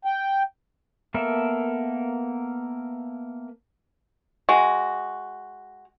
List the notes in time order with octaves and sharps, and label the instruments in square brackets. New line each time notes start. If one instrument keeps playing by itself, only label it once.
[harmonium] G5
[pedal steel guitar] A#3 B3 A4 A#4 E5
[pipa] G#3 F#4